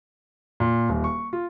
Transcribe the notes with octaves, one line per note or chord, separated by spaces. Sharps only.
A#2
D#1
C#6
F4